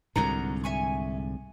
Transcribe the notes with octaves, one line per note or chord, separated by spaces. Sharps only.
C2 G#2 D3 F#4 A#4 A#5
E5 G#5 C#6